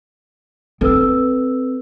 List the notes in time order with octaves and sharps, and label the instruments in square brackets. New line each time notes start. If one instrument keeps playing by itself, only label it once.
[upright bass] C4 [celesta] A4 B4 E6